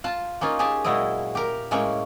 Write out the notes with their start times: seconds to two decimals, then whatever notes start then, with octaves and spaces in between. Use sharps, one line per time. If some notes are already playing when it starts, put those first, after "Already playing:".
0.04 F4 A5
0.41 A#3 C#4 D#4 F4
0.59 G4 G#4 G#5 A5
0.85 A#2 F#3 G#3 E4 D#5
1.35 G4 A#4
1.71 A2 G#3 A#3 C#4 C#5 G5